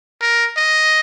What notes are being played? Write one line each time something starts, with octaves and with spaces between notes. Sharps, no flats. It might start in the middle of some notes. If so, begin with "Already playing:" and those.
A#4
D#5